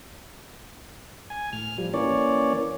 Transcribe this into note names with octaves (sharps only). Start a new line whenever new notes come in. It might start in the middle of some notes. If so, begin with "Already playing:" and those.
G#5
A2 F6
F3 G3
E3 A#3 C#4 C#5 D5